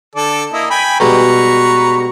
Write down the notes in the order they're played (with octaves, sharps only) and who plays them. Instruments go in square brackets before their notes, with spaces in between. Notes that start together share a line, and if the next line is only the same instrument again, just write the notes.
[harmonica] D3 A4 D5
A#3 E4 D#5
G5 G#5 B5
[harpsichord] B2 G3 G#3 [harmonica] B4 A#5 C#6